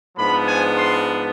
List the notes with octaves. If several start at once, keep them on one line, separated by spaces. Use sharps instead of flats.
G#2 F3 B3 D4 B5
G#5
C6